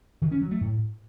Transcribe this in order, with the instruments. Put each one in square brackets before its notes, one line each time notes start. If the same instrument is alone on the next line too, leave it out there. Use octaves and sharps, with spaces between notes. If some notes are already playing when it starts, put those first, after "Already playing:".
[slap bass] D#3
C#4
F#3
A3
A2